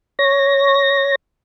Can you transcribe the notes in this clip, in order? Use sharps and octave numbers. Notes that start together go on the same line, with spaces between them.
C#5 A#6